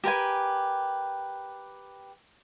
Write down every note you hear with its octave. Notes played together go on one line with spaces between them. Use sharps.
G4 A#4 B4 G#5